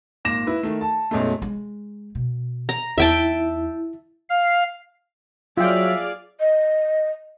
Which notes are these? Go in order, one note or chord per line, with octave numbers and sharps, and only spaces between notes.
G#1 A#2 D6 A#6 E7
E4 B4
D#3 A3
A5
B1 F#2 G#3 A3
G#3
B2
A#5
E2 D#4 E4 E5 G5 A5
F5
F#3 F4 G#4 D5 E5 F5 G5
D#5